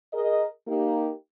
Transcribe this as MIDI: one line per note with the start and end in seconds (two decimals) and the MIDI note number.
0.13 0.45 68
0.13 0.45 70
0.13 0.45 75
0.67 1.10 58
0.67 1.10 63
0.67 1.10 67